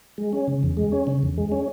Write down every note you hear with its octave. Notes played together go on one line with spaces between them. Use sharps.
G#3
C#4
C#3
E2
G#3
C#4
C#3
E2
G#3
C#4